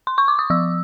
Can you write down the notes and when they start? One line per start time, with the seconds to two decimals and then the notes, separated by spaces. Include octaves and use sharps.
0.07 C6
0.18 C#6
0.28 D6
0.39 D#6
0.50 F3 E6